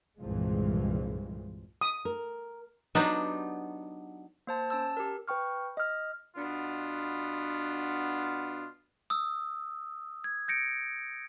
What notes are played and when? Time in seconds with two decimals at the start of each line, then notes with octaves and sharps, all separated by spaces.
0.20 C2 G2 A#2 E3 F3 G#3
1.81 D#6
2.05 A#4
2.95 F#3 B3 D4 D#4 G4
4.47 A#3 C5 A5
4.70 C#4 A5 E6
4.97 G4 A#4
5.28 B4 G5 C#6 F6
5.77 D#5 F6
6.36 B2 B3 D4 F4
9.10 D#6 E6
10.24 G#6
10.48 G6 A#6 C#7 D7